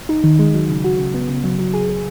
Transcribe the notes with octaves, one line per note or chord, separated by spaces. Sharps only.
D#4
D#3
G#3
F#3
C#3
F#4
C#3
B3
C#3
F#3
F#3
G#4
G#4